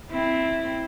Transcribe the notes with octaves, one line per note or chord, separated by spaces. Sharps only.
C4 E4